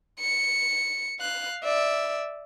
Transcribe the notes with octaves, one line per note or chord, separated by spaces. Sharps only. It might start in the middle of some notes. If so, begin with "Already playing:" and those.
C#7
F5 F#6
D5 E5